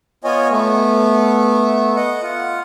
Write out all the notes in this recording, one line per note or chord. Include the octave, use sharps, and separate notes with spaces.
B3 F4 C#5 D#5 G#5
A3 B3
D#5 F#5
F4 F#5